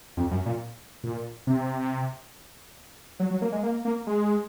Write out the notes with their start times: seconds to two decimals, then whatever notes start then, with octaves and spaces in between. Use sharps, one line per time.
0.17 F2
0.31 F#2
0.46 A#2
1.04 A#2
1.47 C3
3.20 F#3
3.31 F#3
3.42 A#3
3.52 G#3
3.63 A#3
3.85 A#3
4.07 G#3